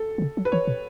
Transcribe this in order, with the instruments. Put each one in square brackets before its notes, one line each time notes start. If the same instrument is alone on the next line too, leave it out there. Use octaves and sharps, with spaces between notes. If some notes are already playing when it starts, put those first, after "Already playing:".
Already playing: [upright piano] A4
[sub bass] E3
C#3
F#3
[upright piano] B4
[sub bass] E3 [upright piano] C#5
[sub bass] B2